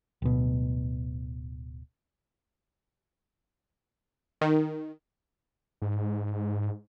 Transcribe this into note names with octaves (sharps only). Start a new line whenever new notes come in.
D1 B2
D#3
G#2